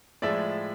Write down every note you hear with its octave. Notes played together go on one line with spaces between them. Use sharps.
A2 F3 G#3 D5 E5